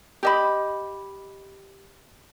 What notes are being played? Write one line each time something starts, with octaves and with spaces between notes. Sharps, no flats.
G4 D#5 B5